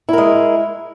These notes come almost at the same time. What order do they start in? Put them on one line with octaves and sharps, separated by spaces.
E4 A#4 G#3